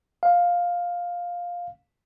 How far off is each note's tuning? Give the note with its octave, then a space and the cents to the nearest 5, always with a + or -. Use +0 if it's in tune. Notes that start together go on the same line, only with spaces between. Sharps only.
F5 +10